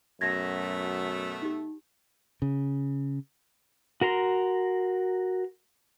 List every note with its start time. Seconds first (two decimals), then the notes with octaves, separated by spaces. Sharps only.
0.21 F#2 B2 A3 G#6 A#6
1.42 D#4 G4
2.42 C#3
4.01 F#4 A#4 A#5 C6